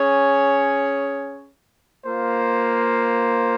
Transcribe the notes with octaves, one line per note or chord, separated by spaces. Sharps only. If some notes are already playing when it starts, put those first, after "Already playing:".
Already playing: C#4 G#4 C#5
A#3 F4 C5